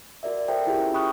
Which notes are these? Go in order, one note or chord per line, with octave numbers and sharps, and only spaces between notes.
F#4 A#4 D5 E5
F#4 A4 A#4 C5 E5 G5
E4 F4 G4 G#4 E5
C#4
G5 B5 C#6 D#6 F6 F#6